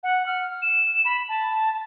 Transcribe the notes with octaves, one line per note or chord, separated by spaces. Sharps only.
F#5
F6
E7
B5
A5